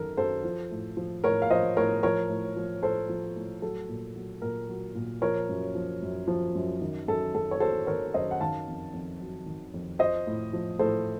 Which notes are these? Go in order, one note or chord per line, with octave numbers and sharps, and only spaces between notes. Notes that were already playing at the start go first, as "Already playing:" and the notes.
Already playing: F#2 D#3 F#3 A4 A#4
F#2 A4 C5
F3
A2
F3
A2 A#4 C#5
F5
F3 C5 D#5
A2 A#4 C#5
F3 A#4 C#5
A2
F3
A2 A4 C5
F3
A2
F#3 A4
A#2
F#3
A#2 A#4
F#3
A#2
F3 A#4 C#5
F#2
F3
F#2
F3
F#2
D#3
F#2 A4
F#2 A4
C#5
F#3 A4 C5
D#3 A#4 C#5
F#2 C5 D#5
F#5
D#3 F5 A5
F2
F2
F#3
D#3
F2
F3 C5 D#5
A2
F3
A2 A4 C5